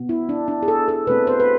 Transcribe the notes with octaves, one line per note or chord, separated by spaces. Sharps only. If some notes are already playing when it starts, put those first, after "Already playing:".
Already playing: B2 B3
E4
D4
D4
G#4
A4
A4
B2 A3 C4 B4
C5
B4